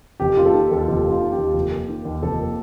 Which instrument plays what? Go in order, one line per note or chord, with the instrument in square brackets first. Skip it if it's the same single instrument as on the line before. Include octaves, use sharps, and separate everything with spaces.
[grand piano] F1 [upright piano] G4
[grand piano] A#3 [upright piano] F4
[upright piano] A4
[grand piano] D#3 [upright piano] G4
[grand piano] D#2 [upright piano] A4
[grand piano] F1 [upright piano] G4
[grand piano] A#3
[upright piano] F4
[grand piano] D#3
[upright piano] G4
[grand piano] D#2
F1
A#3
D#3
D#2
[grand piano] F1 [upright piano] A4
[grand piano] A#3